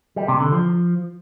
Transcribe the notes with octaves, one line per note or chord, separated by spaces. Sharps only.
G3
C3
D3
F3